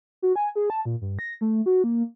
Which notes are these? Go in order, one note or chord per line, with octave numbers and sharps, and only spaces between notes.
F#4
G#5
G#4
A5
A#2
G2
A#6
A3
F#4
A#3